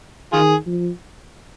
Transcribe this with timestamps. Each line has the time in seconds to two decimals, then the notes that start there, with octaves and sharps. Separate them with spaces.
0.33 D#3 F4 G#4
0.66 F3